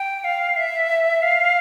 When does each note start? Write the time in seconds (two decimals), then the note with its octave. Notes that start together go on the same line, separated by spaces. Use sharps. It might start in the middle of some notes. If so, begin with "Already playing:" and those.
Already playing: G5
0.24 F5
0.56 E5
1.22 F5